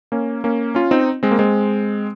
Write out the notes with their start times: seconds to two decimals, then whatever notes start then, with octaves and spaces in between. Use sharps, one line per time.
0.12 A#3 C#4
0.44 A#3 C#4
0.75 C#4 F4
0.91 C4 D#4
1.23 G#3 C4
1.31 A#3
1.39 G#3 C4